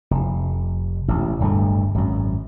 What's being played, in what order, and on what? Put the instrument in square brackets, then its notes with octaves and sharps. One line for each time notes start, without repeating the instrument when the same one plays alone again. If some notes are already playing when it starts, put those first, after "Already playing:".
[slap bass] F1
E1 A1
D1 G1 G2 A3
G#1 F#2